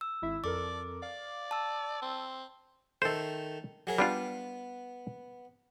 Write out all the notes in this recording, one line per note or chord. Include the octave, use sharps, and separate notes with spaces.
E6
G#1 E4 E5
F2 A4 A#4 D5 D6
D5 F5
A5 E6
C4
D#3 A3 A4 C5
F#3 G#4 A#4
G3 B3 D4 F4